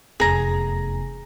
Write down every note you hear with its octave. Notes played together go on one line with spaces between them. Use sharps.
F1 E2 G#4 A#5